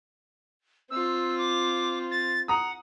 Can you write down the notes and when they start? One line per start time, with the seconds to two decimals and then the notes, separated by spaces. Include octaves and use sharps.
0.90 C4 F4 E6
1.38 D6
2.11 A6
2.48 F#5 A#5 D#6